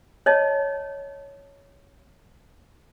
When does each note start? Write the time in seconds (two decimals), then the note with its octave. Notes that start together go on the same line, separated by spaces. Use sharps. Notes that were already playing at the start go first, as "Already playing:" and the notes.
0.26 C#5 D#5 A5